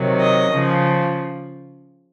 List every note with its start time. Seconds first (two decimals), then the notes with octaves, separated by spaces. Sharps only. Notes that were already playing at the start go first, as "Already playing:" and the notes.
Already playing: C3 D#3 F#3
0.19 D#5
0.51 C#3 F3